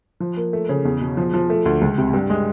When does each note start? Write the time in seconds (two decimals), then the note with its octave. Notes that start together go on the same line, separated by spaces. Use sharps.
0.20 F3
0.37 A#3
0.53 A3
0.69 C#3
0.85 E2
1.01 B2
1.17 F3
1.34 F3
1.50 A3
1.66 D2
1.82 C#2
1.98 C3
2.13 G2
2.30 G#3